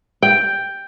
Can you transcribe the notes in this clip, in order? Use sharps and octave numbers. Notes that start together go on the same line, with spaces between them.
G5